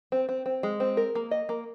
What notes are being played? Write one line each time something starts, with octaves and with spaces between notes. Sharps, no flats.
C4
C4
C4
G#3
C4
A#4
A#3
D#5
A#3